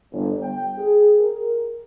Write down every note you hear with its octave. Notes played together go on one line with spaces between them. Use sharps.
G1
G5
G#4
A#4